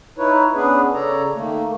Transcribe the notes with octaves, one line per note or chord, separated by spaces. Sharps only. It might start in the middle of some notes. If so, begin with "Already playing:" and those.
D#4 E4 B4 C#5
B3 C#4 D4 G#4 B4
C#3 A4 C#5 D5 A#5
D#3 A3 A#3